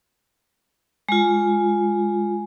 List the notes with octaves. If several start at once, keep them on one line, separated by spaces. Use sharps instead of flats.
G#3 F4